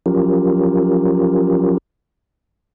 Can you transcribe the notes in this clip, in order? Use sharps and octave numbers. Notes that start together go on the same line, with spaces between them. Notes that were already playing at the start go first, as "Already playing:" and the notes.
F3 F#3 C#4 F4 G4 A#4